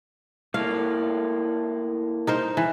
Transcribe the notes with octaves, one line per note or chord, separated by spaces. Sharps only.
A3 A#3 E4 F5
D#4 A#4 C5
E3